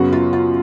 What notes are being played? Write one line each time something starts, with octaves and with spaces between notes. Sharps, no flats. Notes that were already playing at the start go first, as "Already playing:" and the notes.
Already playing: F#2 C#3 F#3 B3 F#4
F4
F4